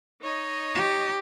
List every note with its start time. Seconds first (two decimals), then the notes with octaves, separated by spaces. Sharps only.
0.21 D#4 C#5 D#5
0.75 G4